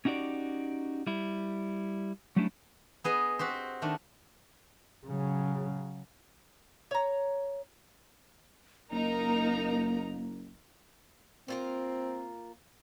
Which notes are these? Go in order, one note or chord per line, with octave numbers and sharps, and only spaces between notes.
C#4 D#4 F#4 G4 D5
G3 E4
F#3 G3 A3 C#4 D4 E4
B3 G#4 D#5
C4 F#4 G4 C5
D#3 A3 D4
C#3 F#3
C#5 A#5
F#1 A#3 D#4 A#4 A#5
A#3 C4 F4 A#4